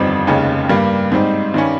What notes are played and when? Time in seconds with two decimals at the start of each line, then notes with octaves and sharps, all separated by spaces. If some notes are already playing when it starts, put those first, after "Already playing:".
Already playing: G1 F2 D#3 G3 C4
0.27 F1 D#2 C#3 G#3 C#4
0.69 G2 G3 A#3
1.12 G#2 G3 C4 D#4
1.54 G2 D#3 G3 C#4